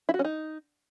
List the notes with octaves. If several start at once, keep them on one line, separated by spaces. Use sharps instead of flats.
E4
F#4
C#4
D#4